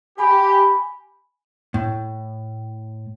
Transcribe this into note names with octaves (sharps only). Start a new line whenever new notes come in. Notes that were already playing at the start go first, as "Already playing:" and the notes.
G4 G#5 B5
A2